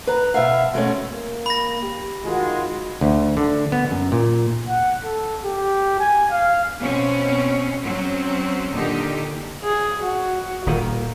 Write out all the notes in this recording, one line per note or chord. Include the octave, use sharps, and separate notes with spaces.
B4 A#5
B2 E5 F5
B2 G#3 A3 C#4
A#3
B5 A#6
G4
D#3 G#3 F4 F#4
D2
D3
B3
F#2
A#2
F#5
A4
G4
G#5
F5
B2 C4 C#4
F#3 C4 C#4
A#2 D3 D#3 D#4 G4
G#4
F#4
D#1 A#2 D#3 A#3